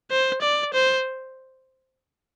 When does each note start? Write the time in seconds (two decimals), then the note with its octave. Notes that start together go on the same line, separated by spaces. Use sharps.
0.11 C5
0.42 D5
0.74 C5